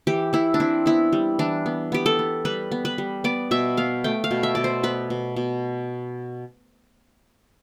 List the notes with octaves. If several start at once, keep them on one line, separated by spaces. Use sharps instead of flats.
E3 G4
E3 E4
D4
C4 E4
B3 E4
G3
E3 D4
B3
B3 G4
A4
B3
G3 B4
B3
B4
G3
B3 D5
B2 E5
B3 F5
A3 G5
F5
B2
E5
B2 D5
C5
B3 B4
B2
B2